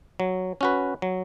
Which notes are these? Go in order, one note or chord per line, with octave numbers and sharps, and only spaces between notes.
F#3
C#4 F#4 B4
F#3